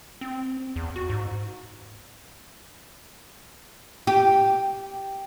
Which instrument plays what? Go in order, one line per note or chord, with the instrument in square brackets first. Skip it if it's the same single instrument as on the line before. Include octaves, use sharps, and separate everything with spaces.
[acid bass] C4
E2
F#4
G#2
[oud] G4